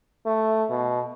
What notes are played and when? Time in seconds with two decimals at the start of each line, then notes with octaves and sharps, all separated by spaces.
0.26 A3
0.70 B2